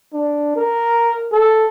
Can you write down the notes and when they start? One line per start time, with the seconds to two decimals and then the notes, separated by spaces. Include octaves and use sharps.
0.13 D4
0.56 A#4
1.32 A4